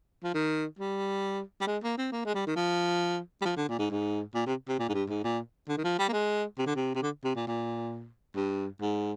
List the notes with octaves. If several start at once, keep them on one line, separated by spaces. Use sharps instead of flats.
F3
D#3
G3
G3
G#3
A#3
C4
A#3
G#3
G3
D#3
F3
G3
F3
D3
A#2
G#2
G#2
A#2
C3
C3
A#2
G#2
G2
G#2
A#2
D3
D#3
F3
G3
A#3
G#3
C3
D3
C3
C3
D3
C3
A#2
A#2
G2
G#2